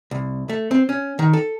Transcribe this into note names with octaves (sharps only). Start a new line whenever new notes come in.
C2
A3
C4
C#4
D#3
A4